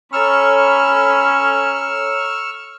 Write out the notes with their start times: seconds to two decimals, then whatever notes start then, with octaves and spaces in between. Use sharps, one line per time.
0.13 C#4 A4 C#5 A#5 B5 C#6 E6 F6